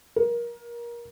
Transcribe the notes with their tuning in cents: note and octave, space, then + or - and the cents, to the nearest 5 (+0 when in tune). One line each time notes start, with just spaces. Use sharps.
A#4 +25